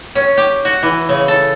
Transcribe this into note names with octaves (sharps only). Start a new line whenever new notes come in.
C#4
G4
F#4
E3
C#3
A4